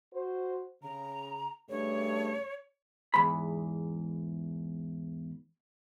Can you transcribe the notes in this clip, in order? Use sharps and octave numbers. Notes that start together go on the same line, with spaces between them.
F#4 C5
C#3 A#5
G2 C#3 A3 C#5
E2 G#2 B5